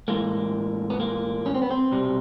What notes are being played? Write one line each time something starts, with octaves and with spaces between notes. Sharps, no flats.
A2 E3 G#3 A#3
B3
A#3
C#4
C4
B3
C4
C2 B2 G3